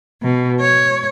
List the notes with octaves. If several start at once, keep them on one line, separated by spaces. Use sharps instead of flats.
B2
C#5